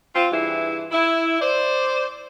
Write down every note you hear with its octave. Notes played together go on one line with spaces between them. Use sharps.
C4 F4
G2 E3 E4 G#4
E4
C5 D5